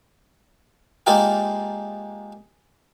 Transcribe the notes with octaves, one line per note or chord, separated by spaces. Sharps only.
G#3 A#3 D4 D#4 F4 G4